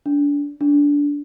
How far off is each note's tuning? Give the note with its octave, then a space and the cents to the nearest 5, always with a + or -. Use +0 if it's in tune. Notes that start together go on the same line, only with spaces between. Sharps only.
D4 -30
D4 -20